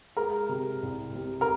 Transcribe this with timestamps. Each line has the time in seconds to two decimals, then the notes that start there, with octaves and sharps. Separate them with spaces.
0.17 G#3 A#4
0.49 C3
0.82 C2
1.15 C3
1.41 A#4